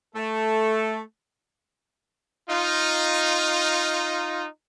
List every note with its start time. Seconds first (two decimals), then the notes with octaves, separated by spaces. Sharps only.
0.15 A3 A4
2.50 D#4 F4